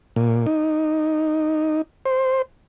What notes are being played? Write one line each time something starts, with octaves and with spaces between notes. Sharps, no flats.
A#2
D#4
C5